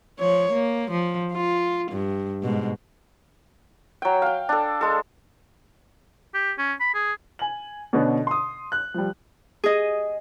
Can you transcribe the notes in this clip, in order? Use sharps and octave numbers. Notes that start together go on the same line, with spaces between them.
F3 C#5
A#3
F3
F4
G2
G#2 B2
F#3 G5
F5 G5
D4 A4
G#3 A4
G4
C#4
B5
G#4
G#5 F#7
B2 D3 B3 C#4 D4
C6 D#6
F#6
F3 G3
G#4 D#5